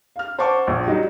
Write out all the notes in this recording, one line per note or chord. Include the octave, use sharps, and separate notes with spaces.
F5 F6
C5 F#5 A5 C#6 D6
A#1
F#3 G3 D#4